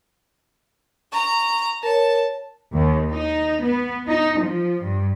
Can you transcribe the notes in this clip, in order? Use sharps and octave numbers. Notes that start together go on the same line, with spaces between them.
A#5 C#6
A#4 C#5 A5
D#2
D#4
B3
D#4
F3
G2